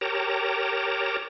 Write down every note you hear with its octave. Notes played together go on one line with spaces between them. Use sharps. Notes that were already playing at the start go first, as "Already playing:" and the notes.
G4 A#4 C#5 G5 A5 A#5